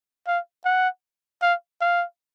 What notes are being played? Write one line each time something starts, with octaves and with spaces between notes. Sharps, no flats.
F5
F#5
F5
F5